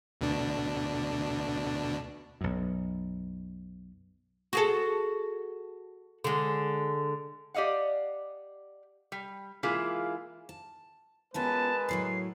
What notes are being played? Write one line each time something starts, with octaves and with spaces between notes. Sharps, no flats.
D2 B2 D4
B1 F#2
F#4 G#4 A4
D3 G#3
G4 D5 D#5 F5 F#5
G3
E3 G#3 A#3 E4 F4 G#4
A5
B2 G#3 C#4 F4 A#4 B4 A5
A2 F#3 A3 C7